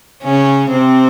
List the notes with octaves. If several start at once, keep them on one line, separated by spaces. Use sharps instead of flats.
C#3 C#4
C3 C4